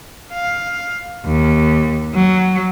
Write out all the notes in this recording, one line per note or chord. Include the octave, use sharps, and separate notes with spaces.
F5
D#2
F#3